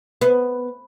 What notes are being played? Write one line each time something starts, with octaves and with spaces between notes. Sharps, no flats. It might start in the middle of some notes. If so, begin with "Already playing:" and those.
B3